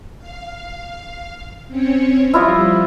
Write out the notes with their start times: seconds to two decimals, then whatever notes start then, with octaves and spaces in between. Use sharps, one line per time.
0.18 F5
1.67 C4 C#4 C#5
2.34 F3 G3 E4 F4 D#5